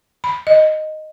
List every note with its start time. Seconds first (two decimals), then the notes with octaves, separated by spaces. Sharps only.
0.24 B5
0.47 D#5